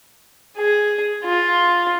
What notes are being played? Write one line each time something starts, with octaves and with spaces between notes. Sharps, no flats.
G#4
F4